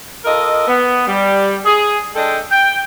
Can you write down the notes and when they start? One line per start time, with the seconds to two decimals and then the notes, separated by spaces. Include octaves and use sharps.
0.25 F4 A4 A#4 D#5
0.68 B3
1.07 G3
1.65 G#4
2.15 G#3 D4 A4 D#5 G5
2.51 G5